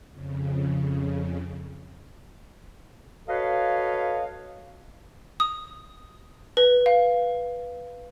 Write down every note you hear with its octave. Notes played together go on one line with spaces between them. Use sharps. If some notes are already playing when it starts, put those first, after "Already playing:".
F2 C#3
F#4 A4 B4 C#5 D#5 F5
D#6
B4
F5